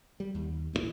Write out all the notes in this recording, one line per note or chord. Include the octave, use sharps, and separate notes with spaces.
G3
D#2
A1 G2 A#2 E3